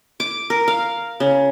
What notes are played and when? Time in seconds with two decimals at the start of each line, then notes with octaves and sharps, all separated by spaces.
0.20 D6
0.50 A#4
0.68 F5
1.20 C#3